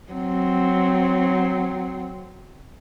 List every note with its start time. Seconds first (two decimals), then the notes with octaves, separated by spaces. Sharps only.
0.12 F#3 C4